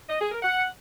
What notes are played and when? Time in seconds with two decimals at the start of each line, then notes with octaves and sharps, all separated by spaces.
0.09 D#5
0.20 G#4
0.31 A#4
0.43 F#5